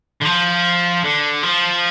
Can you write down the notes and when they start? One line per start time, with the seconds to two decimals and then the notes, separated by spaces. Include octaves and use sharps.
0.22 D3
0.26 F3
1.04 D3
1.43 F3